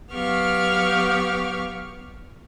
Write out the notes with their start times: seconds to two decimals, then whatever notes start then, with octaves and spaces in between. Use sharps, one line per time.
0.13 F#3 B3 G4 F5 C#6 F6